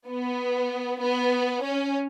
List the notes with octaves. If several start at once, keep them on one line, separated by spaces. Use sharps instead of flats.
B3
B3
C#4